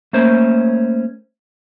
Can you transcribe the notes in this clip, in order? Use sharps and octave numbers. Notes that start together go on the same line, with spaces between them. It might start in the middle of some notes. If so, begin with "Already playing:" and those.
A3 A#3 C#4 C5